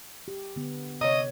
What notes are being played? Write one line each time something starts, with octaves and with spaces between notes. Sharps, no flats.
G4
D3 B3
C3 C#5 D#5